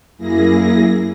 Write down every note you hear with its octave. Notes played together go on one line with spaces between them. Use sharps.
F#2 A#3 E4 G#4 A#6